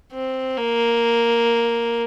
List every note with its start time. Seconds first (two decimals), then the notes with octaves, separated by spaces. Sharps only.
0.12 C4
0.58 A#3